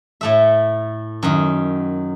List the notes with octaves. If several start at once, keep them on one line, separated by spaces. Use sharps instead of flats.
A2 A3 E5
F#2 D#3